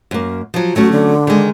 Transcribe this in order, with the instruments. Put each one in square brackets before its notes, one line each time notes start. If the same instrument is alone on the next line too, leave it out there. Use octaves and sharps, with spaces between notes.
[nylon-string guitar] F#2 A#3
F3 F#3
[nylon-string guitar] F#3 A3 C#4 [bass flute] F#4
[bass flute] D3
[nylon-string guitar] D#3 G#3